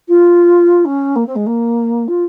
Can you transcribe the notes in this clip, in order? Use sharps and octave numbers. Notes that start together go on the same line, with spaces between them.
F4
C#4
A#3
C4
G#3
A#3
F4